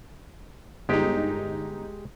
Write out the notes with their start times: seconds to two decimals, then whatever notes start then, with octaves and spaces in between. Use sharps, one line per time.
0.89 G1 G#3 D#4 G4